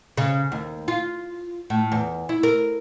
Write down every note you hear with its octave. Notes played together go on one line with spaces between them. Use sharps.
C#3
D#2
F4
A2
E2
E4
A#4